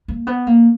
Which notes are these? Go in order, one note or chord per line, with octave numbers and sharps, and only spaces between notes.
A#3
B3
A#3